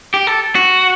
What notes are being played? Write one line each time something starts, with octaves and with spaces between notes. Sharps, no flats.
G4
A4
F#4